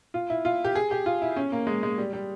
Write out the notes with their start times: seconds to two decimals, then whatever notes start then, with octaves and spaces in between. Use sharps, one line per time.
0.14 F4
0.30 E4
0.45 F4
0.65 G4
0.75 G#4
0.91 G4
1.06 F4
1.22 E4
1.36 C#4
1.52 A#3
1.67 G#3
1.83 G#3
1.98 G3
2.13 G3